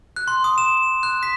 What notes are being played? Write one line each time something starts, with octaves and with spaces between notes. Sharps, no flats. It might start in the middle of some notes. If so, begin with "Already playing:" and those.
F#6
C6
D#6
E7
F#6
B6